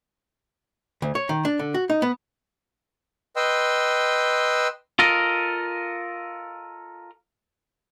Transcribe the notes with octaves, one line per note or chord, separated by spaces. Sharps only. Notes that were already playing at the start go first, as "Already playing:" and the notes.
D2
C#5
D#3
D4
D3
F#4
D#4
B3
B4 D#5 G5 C6 E6
F4 A4 A#4 D#5